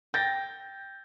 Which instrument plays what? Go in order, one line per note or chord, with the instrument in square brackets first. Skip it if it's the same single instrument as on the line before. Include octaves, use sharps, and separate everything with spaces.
[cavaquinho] G5 [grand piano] G6 A6 A#6